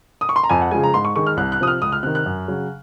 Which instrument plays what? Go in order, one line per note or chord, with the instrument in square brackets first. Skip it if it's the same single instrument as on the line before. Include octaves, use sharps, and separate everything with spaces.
[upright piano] D#6
C#6
C6
A#5
F2 G#5
F#5
C#3 F3 G#3 G#5
A#5
G#2 C6
C#6
D#3 G#3 C#6
F6
C2 F#6
F#6
C3 F3 D#6
F6
C#2 D#6
F6
C3 F#6
D#3
F#6
F#2
C#3 F#3